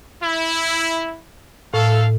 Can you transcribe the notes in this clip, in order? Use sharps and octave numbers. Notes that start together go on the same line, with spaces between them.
E4
A2 A4 F5